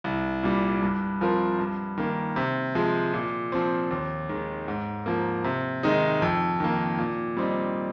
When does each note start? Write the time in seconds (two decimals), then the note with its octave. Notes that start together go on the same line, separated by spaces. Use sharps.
0.04 C2
0.43 A#2 G3
0.83 G2
1.21 F3 C4 F4 A#4
1.59 G2
1.98 D#3 A#3
2.36 C3
2.75 F3 G#3
3.13 A#2
3.52 F3 C4
3.91 D#2
4.29 D#3 G#3
4.68 G#2
5.06 F3 A#3
5.44 C3
5.83 D#3 G#3 D#4
6.22 F2
6.60 D#3 A#3
6.98 A#2
7.37 G3 C4 D#4